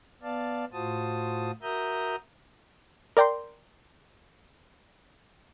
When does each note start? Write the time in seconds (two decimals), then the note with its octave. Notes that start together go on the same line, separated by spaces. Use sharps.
0.23 B3 D5 F5 A5
0.73 A2 F4 F#4 C5 A5 D#6
1.62 F#4 A#4 E5 A#5 D#6 G6
3.17 A#4 D5 G5 A#5 C6